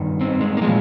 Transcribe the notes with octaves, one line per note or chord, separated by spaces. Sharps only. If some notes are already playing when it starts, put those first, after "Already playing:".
Already playing: G2 D#3
C4
G#3
A#3
A#2 F3 G#3